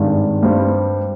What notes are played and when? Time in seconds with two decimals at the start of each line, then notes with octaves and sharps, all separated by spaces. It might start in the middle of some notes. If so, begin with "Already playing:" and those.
Already playing: G#1 G2 D#3 G#3
0.42 G2 G3 C4